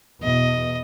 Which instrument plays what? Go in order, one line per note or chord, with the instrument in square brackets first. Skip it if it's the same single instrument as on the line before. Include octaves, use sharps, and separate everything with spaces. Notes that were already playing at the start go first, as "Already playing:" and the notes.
[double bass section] E2 B2 [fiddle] D#5